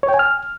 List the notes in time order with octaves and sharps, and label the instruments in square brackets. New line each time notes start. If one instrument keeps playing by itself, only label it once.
[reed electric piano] C#5
G5
G#5
F6